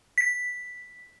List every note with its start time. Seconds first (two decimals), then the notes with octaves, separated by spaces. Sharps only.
0.18 B6